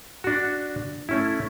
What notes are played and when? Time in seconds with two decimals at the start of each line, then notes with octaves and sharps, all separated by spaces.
0.24 D4 F#4
1.09 A3 C#4 E4